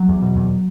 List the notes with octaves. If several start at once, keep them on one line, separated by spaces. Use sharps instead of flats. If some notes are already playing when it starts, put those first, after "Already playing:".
Already playing: F#3
E2
B2
E2